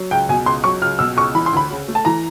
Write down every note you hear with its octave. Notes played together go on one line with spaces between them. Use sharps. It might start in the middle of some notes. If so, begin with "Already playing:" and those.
Already playing: F#3
C#2 G5
B2 G#5
C#2 C6
F#3 C#6
C#2 F6
B2 E6
C#2 C#6
E3 B5
C6
D2 B5
C#3
A3
A5
E3 A#5